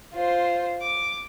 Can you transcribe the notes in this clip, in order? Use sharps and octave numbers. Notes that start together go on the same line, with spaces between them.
F4 C5
D6